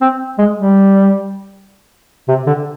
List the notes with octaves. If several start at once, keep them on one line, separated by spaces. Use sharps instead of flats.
C4
G#3
G3
C3
D3